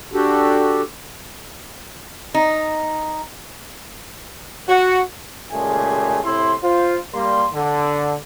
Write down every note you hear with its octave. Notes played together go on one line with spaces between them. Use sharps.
D4 F#4 G4 A4
D#4
F#4
A#2 C#3 G#3 A3 G4 G#5
A2 C3 E4 C6
F4 C5
G3 A#3 C6
D3